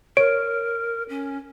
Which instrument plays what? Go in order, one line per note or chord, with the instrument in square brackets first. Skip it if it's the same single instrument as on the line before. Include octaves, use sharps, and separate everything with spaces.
[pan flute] A#4 [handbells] C#5 D7
[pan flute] C#4